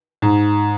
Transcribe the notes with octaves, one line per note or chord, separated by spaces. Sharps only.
G#2